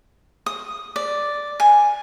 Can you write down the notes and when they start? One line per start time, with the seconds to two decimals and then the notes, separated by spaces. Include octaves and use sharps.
0.46 D#6
0.96 D5
1.60 G#5